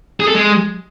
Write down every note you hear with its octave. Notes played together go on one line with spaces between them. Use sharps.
G#4
A4
G#3